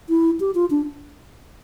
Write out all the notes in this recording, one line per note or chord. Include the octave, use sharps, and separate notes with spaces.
E4
G4
F4
D4